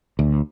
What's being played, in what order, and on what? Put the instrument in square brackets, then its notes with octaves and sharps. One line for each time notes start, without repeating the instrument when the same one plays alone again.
[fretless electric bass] D2